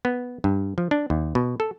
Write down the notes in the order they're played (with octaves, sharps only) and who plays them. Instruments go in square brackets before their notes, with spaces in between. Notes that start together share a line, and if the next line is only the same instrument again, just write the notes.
[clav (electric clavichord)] B3
G2
F3
D4
D#2
B2
A4